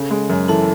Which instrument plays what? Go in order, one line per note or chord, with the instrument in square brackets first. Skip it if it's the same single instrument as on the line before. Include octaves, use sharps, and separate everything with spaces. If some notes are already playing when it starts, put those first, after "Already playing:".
Already playing: [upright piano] C#3 [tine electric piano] A4
[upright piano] G#3
F#2
[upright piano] E3 [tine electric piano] A4 A5